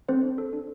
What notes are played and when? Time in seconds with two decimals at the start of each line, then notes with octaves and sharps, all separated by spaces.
0.08 C4 A4 C5
0.23 D4
0.38 A4
0.53 D4